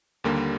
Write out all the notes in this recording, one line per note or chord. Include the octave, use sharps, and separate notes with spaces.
D#2 D3 G3 A#3